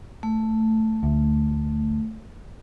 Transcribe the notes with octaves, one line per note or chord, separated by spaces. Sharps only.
A3
D2